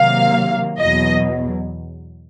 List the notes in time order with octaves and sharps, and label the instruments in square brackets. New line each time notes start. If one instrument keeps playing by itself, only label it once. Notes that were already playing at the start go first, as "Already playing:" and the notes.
Already playing: [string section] C3 D#3 F#3 A#3 F5
E2 B2 F#3 D#5